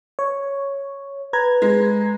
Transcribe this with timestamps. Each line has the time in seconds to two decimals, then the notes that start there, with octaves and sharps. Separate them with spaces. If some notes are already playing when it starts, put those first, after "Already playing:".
0.19 C#5
1.33 B4 A#5 G#6
1.62 G#3